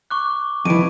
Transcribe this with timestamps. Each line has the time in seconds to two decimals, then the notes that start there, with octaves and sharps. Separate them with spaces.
0.10 C#6 D6 F#6
0.65 F2 E3 D7 D#7